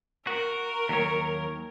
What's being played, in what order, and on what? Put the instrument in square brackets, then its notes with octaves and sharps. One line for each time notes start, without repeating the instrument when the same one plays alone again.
[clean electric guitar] F#4 [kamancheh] A#4
[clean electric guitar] D#2 F#3 C#5